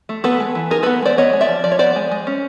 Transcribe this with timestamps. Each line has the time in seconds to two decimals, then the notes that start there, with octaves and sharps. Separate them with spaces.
0.09 A3
0.24 B3 A4 B4
0.40 G#3
0.55 E3
0.71 D#4 G#4 A#4
0.83 B3 A4 B4
1.02 G#3 C5 D5
1.17 B3 C#5 D#5
1.33 G#3
1.41 D5 E5
1.49 F3
1.64 F3 D5
1.72 C#5
1.79 B3 C5 D5
1.96 G#3
2.11 G#3
2.27 C#4